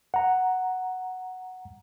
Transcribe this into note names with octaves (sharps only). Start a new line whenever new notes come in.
F#5 A#5